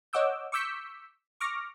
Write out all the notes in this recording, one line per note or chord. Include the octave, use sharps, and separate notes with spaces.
C#5 D#5 F#5 D6 E6 G6
C#6 D6 E6 G6 B6 C#7
C#6 D6 F6 A#6